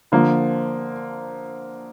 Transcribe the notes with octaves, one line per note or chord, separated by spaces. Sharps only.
D3 F3 A#3